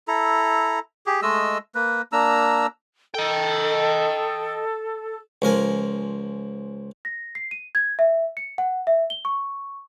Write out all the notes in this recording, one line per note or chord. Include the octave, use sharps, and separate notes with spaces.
E4 A4 A#5
G4 G#4
G#3 A3 D#5 E6
A#3 B4
A#3 D4 A#5 E6
A4 D#5 G5
C#2 F3 A#4 G#5
A#6
C7
D#7
G#6
E5
C#7
F#5
E5
G7
C#6